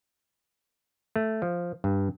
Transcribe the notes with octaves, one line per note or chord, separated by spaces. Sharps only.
A3
F3
G2